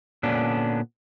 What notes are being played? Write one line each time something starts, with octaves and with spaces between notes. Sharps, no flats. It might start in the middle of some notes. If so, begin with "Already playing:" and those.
A#2 D3 B3 C#4 D4